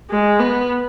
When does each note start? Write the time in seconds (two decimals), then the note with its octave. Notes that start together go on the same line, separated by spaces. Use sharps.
0.10 G#3
0.40 B3